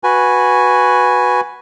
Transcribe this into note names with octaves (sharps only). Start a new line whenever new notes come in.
F#4 B4 G#5